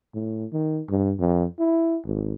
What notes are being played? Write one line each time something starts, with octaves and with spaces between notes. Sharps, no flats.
A2
D#3
G2
F2
E4
G#1